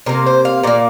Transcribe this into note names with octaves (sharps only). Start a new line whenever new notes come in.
C3 A#3 A#4
C5
F5
A#2 A#3 D5